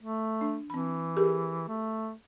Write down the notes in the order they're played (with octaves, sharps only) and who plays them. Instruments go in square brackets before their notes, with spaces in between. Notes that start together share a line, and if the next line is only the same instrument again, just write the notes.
[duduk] A3
[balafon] D4
[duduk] E3 [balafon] C4 B5
[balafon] G4 G#4 A#4
[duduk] A3